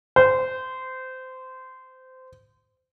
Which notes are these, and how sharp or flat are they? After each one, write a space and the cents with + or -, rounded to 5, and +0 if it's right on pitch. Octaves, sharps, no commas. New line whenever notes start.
C5 -20